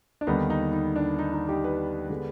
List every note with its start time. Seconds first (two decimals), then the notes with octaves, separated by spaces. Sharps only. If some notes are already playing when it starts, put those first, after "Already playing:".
0.21 D4
0.27 D#2 D3 G3 B3 D#4
0.50 D#4
0.73 D#4
0.96 D4
1.19 D#4
1.34 D#4
1.49 D#4 G4
1.64 G4 B4
2.10 D3 G#3 B3